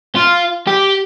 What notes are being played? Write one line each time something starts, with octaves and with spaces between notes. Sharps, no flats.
F4
G4